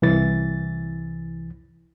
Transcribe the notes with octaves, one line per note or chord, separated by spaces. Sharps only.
C2 E3 A6